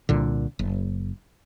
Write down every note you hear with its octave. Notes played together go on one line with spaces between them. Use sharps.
C2 A#2 D3
F#1